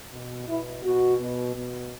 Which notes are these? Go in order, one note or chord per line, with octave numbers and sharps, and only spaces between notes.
B2
B2 E4
B2 F#4
B2
B2